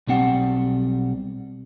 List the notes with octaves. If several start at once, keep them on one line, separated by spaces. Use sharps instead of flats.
B1 G3 C4 F#5